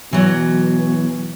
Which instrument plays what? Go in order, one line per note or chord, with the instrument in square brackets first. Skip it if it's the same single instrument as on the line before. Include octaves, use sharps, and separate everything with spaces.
[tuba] B2 [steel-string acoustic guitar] E3 F#3